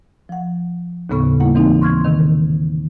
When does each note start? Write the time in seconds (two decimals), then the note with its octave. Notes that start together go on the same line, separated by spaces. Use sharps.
0.29 F3 F#5
1.10 D#2 A2 C#3 B3 A4 C#6
1.40 G3 A#3 E4 F#5
1.55 E3 C4 D#4
1.81 C6 C#6 F6 G#6
2.04 C3 D#3